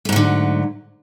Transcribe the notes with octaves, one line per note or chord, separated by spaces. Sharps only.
G#2 D3 F#3 A3